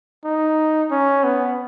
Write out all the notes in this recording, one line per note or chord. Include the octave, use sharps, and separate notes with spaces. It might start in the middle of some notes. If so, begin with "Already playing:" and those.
D#4
C#4
B3